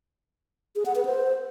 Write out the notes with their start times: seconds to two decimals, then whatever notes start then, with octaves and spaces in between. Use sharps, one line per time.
0.76 G#4
0.86 F#5
0.95 B4
1.05 C5